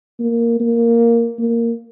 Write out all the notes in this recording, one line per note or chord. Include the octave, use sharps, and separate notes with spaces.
A#3
A#3
A#3